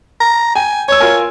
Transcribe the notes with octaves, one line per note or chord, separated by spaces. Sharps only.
A#5
G5 G#5
C#5 C#6 E6
F4 A#4 G#5